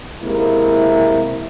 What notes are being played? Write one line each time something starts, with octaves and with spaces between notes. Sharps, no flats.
C3 G#3 A#3 E4